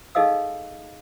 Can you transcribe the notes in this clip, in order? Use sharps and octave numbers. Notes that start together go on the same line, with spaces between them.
D#4 G#4 A4 D#5 F5 E6